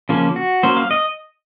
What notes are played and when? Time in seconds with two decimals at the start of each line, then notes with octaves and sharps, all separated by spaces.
0.09 C#3 F3 A#3 C#4
0.36 F#4
0.63 F#3 A#3 C#4 C5
0.77 F5
0.91 D#5